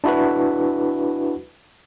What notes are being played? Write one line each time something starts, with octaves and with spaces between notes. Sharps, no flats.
D4 E4 F#4 B4